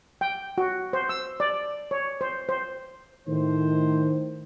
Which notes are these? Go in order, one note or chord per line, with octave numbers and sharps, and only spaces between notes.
G5
F#4
C5
E6
D5
C#5
C5
C5
A2 D#3 C5